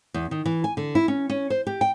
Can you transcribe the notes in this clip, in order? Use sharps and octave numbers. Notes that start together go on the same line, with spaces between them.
E2
D#3
E3
G#5
D3
E4
C#4
C#4
C5
G4
G5